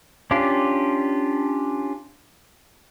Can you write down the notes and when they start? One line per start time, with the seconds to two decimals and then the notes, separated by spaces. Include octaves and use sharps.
0.31 C#4 D4 F4 G4